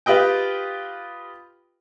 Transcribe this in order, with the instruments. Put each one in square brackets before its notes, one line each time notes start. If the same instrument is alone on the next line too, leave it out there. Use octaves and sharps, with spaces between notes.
[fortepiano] F4 G4 B4 D#5 G5